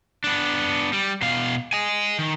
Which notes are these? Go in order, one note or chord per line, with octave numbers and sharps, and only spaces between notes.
B3 D4
G3
B2 F5
D#5 G#5
D#3